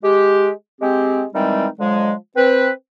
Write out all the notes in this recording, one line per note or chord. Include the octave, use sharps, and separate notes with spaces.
G#3 G4
G#3 C4 G4
D#3 E3 G3 G#3 C4 D#4
D3 F3 F#3 G#3
C4 B4